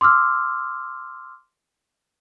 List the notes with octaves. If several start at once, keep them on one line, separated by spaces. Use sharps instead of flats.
C6 D6 E6 F6